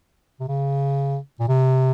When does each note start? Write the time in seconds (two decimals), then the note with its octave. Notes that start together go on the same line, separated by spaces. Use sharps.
0.40 C3
0.48 C#3
1.40 A#2
1.48 C3